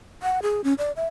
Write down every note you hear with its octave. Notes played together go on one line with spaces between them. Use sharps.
F#5
G#4
C#4
D5
E5